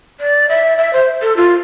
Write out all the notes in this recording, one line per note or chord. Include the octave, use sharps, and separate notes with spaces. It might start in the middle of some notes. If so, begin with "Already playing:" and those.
D5
E5
E5
C5
A4
F4